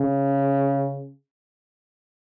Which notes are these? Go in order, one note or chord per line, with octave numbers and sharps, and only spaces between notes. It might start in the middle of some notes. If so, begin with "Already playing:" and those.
Already playing: C#3